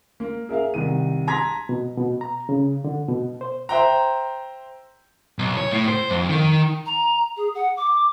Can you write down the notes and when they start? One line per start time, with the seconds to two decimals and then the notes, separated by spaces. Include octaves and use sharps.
0.20 A#3
0.49 G#4 A#4 E5 F5
0.74 C2 D#3 D#7
1.27 A5 A#5 C6 G#6 A#6 B6
1.69 B2
1.97 B2
2.21 A#5
2.49 C#3
2.84 D3
3.09 B2
3.41 C5
3.69 C5 E5 G5 A#5
5.39 B1
5.57 C#5
5.71 A2
5.88 C5
6.11 F2
6.29 D#3
6.86 A#5
7.37 G#4
7.55 F#5
7.77 D6